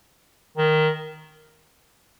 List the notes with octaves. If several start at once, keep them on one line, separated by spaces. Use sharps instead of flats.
D#3